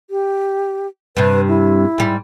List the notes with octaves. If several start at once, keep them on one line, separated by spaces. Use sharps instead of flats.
G4
G2 C3 B4
E4
G#2 G3